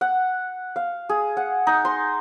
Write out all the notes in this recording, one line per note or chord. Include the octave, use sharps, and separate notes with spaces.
F#5
F5
G#4
F#5
D#4
C6